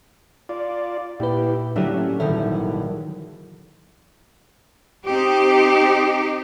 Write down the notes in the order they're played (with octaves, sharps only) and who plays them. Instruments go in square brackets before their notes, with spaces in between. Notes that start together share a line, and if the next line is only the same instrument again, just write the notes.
[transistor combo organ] F4 D5
[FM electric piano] A#2 B4 [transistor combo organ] E4 G4
[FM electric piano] A2 E4 G4 [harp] D3 F#3 A#3 [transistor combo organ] D4 E5
[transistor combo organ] C#4
[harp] D#1 G#1 D#3 [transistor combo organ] E3 [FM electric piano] A4 E5
[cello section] C4 D#4 G4